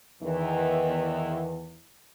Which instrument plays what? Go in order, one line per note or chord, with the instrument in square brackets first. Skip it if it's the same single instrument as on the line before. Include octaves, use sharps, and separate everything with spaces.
[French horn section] E2 D#3 E3